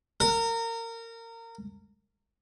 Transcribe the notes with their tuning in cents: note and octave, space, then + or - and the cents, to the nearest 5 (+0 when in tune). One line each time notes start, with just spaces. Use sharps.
A#4 -25